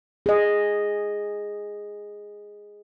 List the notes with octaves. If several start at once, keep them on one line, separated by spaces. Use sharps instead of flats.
G#4 D#5